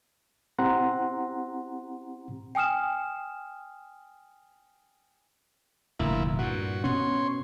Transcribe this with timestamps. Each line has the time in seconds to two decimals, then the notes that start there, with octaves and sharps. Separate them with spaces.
0.58 C4 E4 G4 F#5 A#5 C6
2.55 G5 G#5 D#6 F6 E7
5.99 F1 D2 A#2 E4
6.39 G2 A#2 F#4
6.84 B2 C#4 C#5 C6